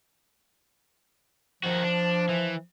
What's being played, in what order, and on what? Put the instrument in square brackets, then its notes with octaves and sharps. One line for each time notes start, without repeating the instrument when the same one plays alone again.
[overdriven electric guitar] D#3 F#4 [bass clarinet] F3
[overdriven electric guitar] D4
E3